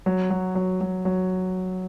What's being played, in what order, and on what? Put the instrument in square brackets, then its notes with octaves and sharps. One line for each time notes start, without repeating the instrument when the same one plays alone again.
[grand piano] F#3
F#3
F#3
F#3
F#3